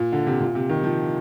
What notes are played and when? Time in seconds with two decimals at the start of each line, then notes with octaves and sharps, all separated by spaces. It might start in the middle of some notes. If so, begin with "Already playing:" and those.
Already playing: A#2
0.12 D3
0.27 C3
0.41 A#2
0.55 C3
0.69 D#3
0.83 F3